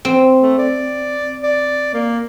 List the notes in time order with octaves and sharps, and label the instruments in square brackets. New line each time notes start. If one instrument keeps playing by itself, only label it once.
[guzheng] C4
[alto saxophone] A3
D5
D5
A#3